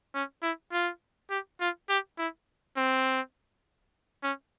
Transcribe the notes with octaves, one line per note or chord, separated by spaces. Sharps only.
C#4
E4
F4
G4
F4
G4
E4
C4
C#4